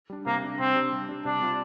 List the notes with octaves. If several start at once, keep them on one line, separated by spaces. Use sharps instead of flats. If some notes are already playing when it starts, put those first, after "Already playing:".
G3 D4
C3 A#3
G3 D4
C3 C4
G3 D4
C3
G3 D4
C3 D4
G3 C4 F4